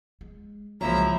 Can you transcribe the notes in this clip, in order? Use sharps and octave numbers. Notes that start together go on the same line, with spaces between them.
G#3
C2 C#3 F3 F#3 G#3 A#3 E4 A#5